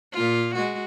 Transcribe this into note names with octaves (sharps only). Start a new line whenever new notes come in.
A#2 F4
G#3 F#4